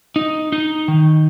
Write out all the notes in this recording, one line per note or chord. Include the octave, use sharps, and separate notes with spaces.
D#4
D#4
D#3